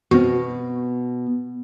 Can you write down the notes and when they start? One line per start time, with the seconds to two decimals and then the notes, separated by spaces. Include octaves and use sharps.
0.11 B2 C4 F#4